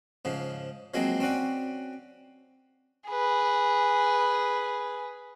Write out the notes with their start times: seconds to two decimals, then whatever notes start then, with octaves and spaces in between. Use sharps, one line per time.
0.25 G#2 C#3 F3
0.94 F3 F#3 G#3 A#3 C4
1.20 C4 C#4 F#4 D5
3.08 G#4 B4